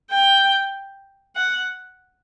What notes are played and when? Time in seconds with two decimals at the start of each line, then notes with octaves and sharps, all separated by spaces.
0.11 G5
1.36 F#5